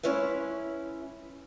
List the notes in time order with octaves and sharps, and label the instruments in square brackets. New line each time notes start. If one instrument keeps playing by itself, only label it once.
[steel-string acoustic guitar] G#3 C#4 E4 B4 E5